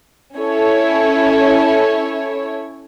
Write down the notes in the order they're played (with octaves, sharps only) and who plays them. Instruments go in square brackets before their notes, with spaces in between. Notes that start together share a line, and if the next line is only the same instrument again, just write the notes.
[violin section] C#4 E4 A4 C#5